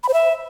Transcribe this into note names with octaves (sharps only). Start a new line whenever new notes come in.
B5
C5
E5